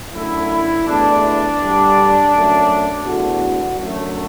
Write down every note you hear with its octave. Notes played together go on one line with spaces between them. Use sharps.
F#2 D3 A3 E4
E2 B2 A3 D4
G2 D3 G3
F#2 F#3 A3
E2 D3 A3 F#4
F#2 D3 F#3 A3